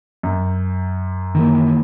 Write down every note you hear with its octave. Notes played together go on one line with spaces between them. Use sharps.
F#2
D#3 E3 A#3